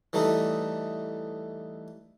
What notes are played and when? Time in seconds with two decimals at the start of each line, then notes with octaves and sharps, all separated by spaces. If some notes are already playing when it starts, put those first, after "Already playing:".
0.13 E3 G3 A3 D#4